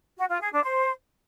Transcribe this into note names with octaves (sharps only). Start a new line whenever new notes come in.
F#4
F4
G#4
D4
C5